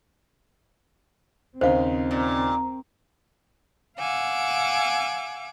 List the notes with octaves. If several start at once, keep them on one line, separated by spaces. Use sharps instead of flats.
D#2 C#3 C4 D#4 C5 F5
A#2
F5 F#5 G#5 D6 E6